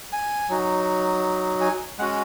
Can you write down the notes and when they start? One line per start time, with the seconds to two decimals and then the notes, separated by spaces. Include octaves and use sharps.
0.13 G#5
0.49 F#3 D#4 F#4
1.61 G#5
1.98 G#3 C#4 F#4 F#5